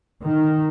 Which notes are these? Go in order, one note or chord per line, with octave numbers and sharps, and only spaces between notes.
D#3